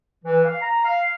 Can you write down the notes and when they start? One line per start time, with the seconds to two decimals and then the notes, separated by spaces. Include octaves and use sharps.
0.24 E3
0.44 F5
0.61 A#5
0.84 F5